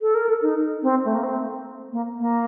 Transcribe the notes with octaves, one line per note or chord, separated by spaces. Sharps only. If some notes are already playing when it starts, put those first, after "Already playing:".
A4
A#4
A4
D#4
C4
A3
A#3
C4
A#3
A#3